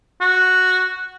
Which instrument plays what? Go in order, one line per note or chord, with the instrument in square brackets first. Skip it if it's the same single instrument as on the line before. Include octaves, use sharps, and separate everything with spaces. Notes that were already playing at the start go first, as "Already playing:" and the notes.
[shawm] F#4